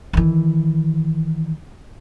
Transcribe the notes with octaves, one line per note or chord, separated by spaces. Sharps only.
D#3 E3